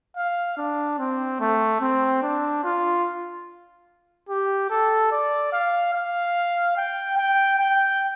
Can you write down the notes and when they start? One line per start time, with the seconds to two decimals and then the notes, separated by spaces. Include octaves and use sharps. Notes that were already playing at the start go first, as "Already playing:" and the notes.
0.17 F5
0.57 D4
0.99 C4
1.40 A3
1.81 C4
2.23 D4
2.64 F4
4.29 G4
4.70 A4
5.12 D5
5.53 F5
5.94 F5
6.77 G5
7.18 G5
7.59 G5